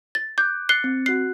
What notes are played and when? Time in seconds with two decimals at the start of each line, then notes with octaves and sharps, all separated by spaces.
0.15 A6
0.38 D6 F#6 G6
0.69 F#6 A6 C7 C#7 G7
0.84 C4
1.06 F#4 F#6 C7